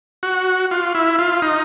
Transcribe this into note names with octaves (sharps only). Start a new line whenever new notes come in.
F#4
F4
E4
F4
D#4